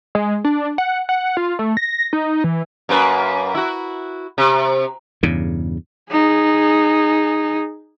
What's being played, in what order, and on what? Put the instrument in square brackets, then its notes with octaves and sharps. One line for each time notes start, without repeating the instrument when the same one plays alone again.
[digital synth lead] G#3
D4
F#5
F#5
F4
A3
A#6
D#4
E3
[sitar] F#2 A#3 B4
E4 F#4
C3
[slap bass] E2 G2 C#3
[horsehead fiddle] D#4 G#4